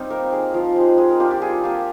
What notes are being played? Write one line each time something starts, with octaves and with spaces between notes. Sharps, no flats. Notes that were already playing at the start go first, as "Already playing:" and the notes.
Already playing: G3 C4 D#4 F4 G4
A#3 A#4
D#4 G#4
F3 F4
G#3 D#4 G4
G#3
A#4
D4 F4 G4
G4
G3 G#4
A#3 F4 G4